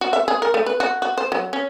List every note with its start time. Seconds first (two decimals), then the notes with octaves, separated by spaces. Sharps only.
0.01 F#4
0.13 E5
0.28 G#4
0.42 A#4
0.54 A3
0.66 B4
0.80 F#4
1.02 F#4
1.18 C5
1.32 F#3
1.53 C#4